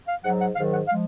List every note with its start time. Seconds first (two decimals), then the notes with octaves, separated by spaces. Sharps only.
0.08 F5
0.24 G#2 F#3 F#5
0.40 F#5
0.55 G#2 D#3 F#3 F5
0.72 F#5
0.88 F3 G#3 F5